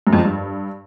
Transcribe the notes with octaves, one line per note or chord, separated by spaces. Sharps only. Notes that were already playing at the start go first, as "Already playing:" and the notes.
F#2
F2
F3
G2